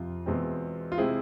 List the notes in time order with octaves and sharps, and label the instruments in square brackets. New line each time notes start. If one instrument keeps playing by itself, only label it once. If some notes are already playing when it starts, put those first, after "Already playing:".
Already playing: [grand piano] F2 C3 F4
E2 B2 G#3 C4
F4
C3 G#3 C4 E4 G#4